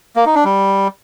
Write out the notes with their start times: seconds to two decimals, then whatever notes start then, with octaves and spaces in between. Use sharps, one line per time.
0.16 A#3
0.26 D#4
0.35 D4
0.45 G3